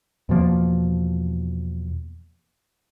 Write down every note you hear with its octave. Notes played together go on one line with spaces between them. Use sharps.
E2 B2 F3 A#3